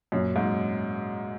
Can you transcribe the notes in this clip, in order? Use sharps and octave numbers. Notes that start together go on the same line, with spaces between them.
F#2 A#2 F#3 C#4
G#2